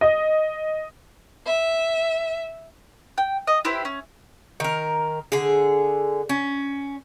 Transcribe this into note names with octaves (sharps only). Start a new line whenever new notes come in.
D#5
E5
G5
D#5
E4 G4 B4 C5
C#4
D#3 A#4
D3 G#4
C#4